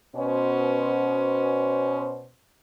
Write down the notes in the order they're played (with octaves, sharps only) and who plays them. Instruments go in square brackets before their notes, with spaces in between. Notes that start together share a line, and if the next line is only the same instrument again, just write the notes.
[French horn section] B2 C#4 C5